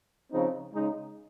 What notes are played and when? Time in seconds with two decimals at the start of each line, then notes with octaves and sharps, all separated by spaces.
0.32 C#3 F3 C4 D#4
0.73 C#3 G#3 D#4